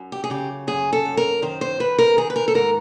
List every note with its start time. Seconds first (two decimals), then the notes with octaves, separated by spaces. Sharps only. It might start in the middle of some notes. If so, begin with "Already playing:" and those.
Already playing: F#2
0.12 G4
0.24 G#4
0.30 C#3 G4
0.67 F#2 G#4
0.93 A4
1.05 F#2
1.17 A#4
1.42 D#3 C5
1.61 C5
1.80 D#3 B4
1.99 A#4
2.17 D#3 G#4
2.30 B4
2.36 A#4
2.48 A4
2.54 G#2 A#4